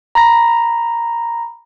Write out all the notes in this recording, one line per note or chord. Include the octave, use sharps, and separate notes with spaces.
A#5 B5 A#6